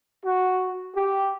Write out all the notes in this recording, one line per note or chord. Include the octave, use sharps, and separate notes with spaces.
F#4
G4